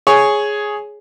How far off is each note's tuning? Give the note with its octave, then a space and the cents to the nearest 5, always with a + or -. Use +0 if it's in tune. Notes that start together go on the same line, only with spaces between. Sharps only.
G#4 +5 C#5 +0